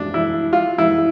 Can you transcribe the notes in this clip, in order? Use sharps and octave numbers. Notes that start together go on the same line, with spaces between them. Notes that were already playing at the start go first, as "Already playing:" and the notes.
Already playing: D4
E4
F4
E4